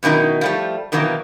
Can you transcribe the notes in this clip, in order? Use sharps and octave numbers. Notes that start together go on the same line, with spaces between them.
F#2 B2 D#3 D#4 E4
F3 G3 A3
B2 D#3 E3 F#3 A3 A#3